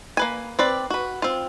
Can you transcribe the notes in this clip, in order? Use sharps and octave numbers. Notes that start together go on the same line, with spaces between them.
A#3 B4 G#5
C4 B4 D5
F#4 B4
C4 F4